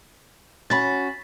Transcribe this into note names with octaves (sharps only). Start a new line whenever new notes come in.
C#4 F#4 B5 A6